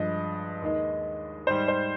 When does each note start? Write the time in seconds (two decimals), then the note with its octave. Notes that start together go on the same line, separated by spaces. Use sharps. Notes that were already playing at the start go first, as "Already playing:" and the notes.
Already playing: G2 F3 G#3 D#5
0.62 D#2 D#3 G#3
1.47 G#2 G3 C5
1.68 C5